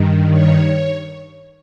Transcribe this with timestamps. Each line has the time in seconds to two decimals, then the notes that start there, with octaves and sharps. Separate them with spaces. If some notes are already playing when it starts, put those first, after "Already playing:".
Already playing: G2 D#3
0.31 C#5